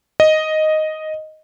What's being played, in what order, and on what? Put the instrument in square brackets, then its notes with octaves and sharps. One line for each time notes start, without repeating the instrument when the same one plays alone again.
[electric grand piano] D#5